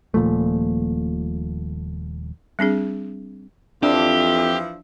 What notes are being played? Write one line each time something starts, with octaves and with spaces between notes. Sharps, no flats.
D#1 A#2 F3 A3
G3 C4 D4 G#4
F2 E3 F3 D4 G4 E5